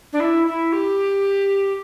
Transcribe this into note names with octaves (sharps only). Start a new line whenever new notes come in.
D4
E4
E4
G4